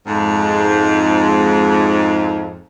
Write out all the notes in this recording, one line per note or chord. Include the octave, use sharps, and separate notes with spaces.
F2 G#2